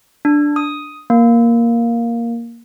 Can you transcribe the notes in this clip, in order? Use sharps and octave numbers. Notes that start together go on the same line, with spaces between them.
D4
D#6
A#3